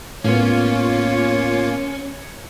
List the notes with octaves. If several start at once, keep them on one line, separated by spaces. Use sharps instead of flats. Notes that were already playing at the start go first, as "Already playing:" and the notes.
A2 A#3 B3 C#4 F4 C#5